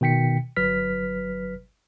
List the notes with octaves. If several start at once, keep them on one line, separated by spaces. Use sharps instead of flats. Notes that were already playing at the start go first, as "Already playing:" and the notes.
B2 D#3 G5 B6 C#7
G1 F#3 B4 F6 B6